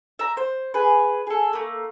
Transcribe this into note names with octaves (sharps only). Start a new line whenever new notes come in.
E5 A#5
C5
G#4 B4
G#4 A4
A3 A#3